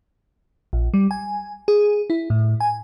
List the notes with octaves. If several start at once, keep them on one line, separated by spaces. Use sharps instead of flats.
A#1
G3
G#5
G#4
E4
A2
G#5